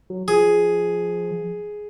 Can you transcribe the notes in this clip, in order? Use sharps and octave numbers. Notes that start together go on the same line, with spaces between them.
F#3
F3 G#4